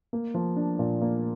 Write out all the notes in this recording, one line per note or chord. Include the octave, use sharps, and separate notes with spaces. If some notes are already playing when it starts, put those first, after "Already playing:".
A#3
F3
D4
A#2
A#3